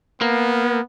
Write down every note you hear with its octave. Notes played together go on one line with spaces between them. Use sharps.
A#3 B3